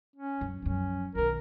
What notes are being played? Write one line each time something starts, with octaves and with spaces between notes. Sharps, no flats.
C#4
F#2
F#2 F3 C#4
B1 D#3 A#4